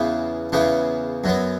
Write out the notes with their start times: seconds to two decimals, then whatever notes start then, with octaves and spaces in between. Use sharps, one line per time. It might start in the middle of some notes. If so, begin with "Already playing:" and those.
Already playing: E2 C#3 E3 B3
0.52 E2 C#3 E3 B3
1.24 F#2 F#3 B3